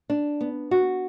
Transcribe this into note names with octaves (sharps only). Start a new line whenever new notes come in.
D4
B3
F#4